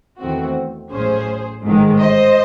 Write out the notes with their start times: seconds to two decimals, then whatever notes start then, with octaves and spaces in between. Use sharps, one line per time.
0.19 E2 D#3 A3 C4 F#4
0.91 A1 A2 F#3 C#4 G#4 C5
1.63 A1 G#2 D#3 G#3
1.99 C5 D#5